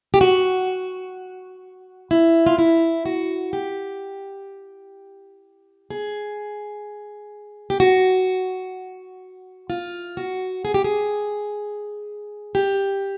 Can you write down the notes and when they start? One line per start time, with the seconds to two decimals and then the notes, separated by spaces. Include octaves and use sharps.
0.14 G4
0.21 F#4
2.11 E4
2.46 F4
2.58 E4
3.06 F#4
3.53 G4
5.90 G#4
7.70 G4
7.80 F#4
9.70 F4
10.17 F#4
10.65 G#4
10.74 G4
10.84 G#4
12.55 G4